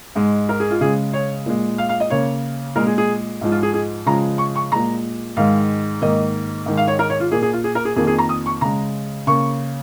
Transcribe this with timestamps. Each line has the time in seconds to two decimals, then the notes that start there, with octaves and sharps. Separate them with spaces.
0.15 G#2 G#3
0.49 A#4
0.60 G#4
0.71 F4
0.81 C#3 G#3 G#4
1.13 C#5
1.46 A#2 G#3
1.78 F5
1.89 F5
2.00 D#5
2.10 C#3 A#3 C#5
2.76 A#2 G#3 A#4
2.87 G#4
2.98 G#4
3.41 G#2 F3 G#3
3.52 F4
3.63 G#4
3.74 G#4
4.06 C#3 F3 G#3 A#5
4.38 C#6
4.56 C#6
4.72 A#2 G#3 A#5
5.36 G#2 D#3 G#3 F5
6.01 G#2 D#3 A#3 D#5
6.66 G#2 D#3 G#3
6.77 F5
6.88 C#5
6.99 A#4
7.10 C#5
7.20 F4
7.32 A#2 A#3 G#4
7.42 G#4
7.53 F4
7.64 G#4
7.75 A#4
7.85 G#4
7.96 F2 D#3 A#3 G#4
8.07 G#4
8.18 A#5
8.29 D#6
8.46 C#6
8.61 C#3 G#3 A#5
9.27 C#3 A#3 C#6